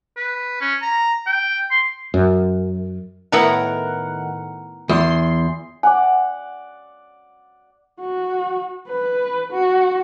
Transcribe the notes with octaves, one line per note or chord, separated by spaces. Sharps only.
B4
C#4
A#5
G5
C6
F#2
A2 D#3 B3 E4 A#4 F#5
E2 C6
D5 F#5 G#5
F#4
B4
F#4